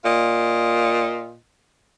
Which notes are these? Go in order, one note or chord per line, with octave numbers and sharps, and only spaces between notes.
A#2 F4 D#5